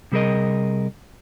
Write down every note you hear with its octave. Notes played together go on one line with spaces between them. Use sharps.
C3 G3 G#4 A#4 D#5